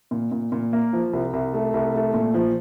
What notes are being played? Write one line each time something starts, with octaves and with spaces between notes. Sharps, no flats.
A#2
A#2
A#2
A#3
F3
C2
C2
A3
C2
A3
A#2
F3